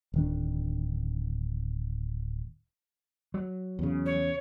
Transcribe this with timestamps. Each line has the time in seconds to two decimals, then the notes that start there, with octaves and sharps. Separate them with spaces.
0.14 D1 D#3 D4
3.34 F#3
3.79 E2 C#3
4.06 C#5